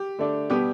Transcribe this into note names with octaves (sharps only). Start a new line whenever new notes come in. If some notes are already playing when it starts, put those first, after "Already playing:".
Already playing: G4
D3 A3 D4
B2 G3 B3 G4